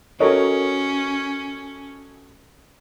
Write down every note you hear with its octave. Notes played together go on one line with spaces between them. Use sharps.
C#4 F#4 A4 A#4 C#5 D#5